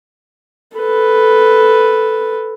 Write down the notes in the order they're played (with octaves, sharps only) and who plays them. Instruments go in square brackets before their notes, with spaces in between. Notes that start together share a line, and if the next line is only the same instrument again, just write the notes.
[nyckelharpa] A4 B4